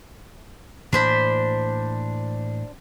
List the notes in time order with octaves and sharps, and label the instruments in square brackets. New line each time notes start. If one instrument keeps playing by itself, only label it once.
[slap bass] A2 E3 A#3 [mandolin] D4 C5 B5